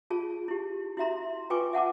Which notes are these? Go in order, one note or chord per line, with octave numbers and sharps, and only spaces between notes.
F4 G#4 A5
E4 G4
E4 F#4 E5 A#5 C6
F4 B4 G5 G#5 C#6 D6
E5 F#5 A5 D6